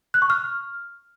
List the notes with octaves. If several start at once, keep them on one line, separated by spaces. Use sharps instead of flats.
F#6
C#6
F6